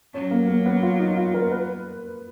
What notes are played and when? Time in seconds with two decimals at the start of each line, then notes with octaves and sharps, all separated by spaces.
0.14 F#3 C#4
0.31 A#3
0.48 A#3
0.66 B3
0.82 F4
1.00 D#4
1.17 F4
1.34 A#4
1.52 B4